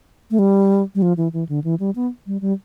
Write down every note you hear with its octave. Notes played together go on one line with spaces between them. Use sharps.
A3
G3
G3
F3
E3
E3
D3
E3
G3
B3
G3
G3